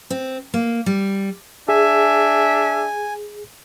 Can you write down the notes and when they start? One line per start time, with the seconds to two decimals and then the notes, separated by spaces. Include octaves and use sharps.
0.10 C4
0.54 A#3
0.86 G3
1.69 D4 G#4 E5 G#5